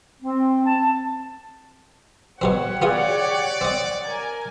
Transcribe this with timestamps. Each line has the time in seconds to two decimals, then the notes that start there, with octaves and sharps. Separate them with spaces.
0.23 C4
0.66 A5
2.42 B2 F#3 C4 G4 C#5 F#5
2.82 B3 F4 G#4 D5
3.61 C4 D#5
4.07 A#4 G#5